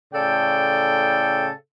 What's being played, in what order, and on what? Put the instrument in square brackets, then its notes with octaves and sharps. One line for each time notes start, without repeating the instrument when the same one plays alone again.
[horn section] A2 C#3 A4 D5 G5